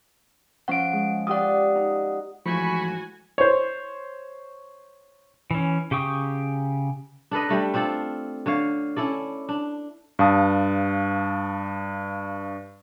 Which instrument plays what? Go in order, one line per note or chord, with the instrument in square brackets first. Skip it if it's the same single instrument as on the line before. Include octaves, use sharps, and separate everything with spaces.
[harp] F3 C#4 C5 [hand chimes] F#5 D7
[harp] G#3
[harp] F4 G4 D5 [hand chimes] F#5 D#6
[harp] D#4
[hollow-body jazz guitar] G#2 E3 A3 [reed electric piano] F3 [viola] F#4 G#5 [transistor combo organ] B5 C#6
[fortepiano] C5 C#5
[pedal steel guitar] E3 C#4
C#3 G4 G5 C#6 D#6
[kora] D4 A4 B4 D#5
G3 A3 D4
C4 D4 F4 A4
D3 C#5 F5
C#4 E4 A4 D5
D4
[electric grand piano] G2 F5 A5 D#6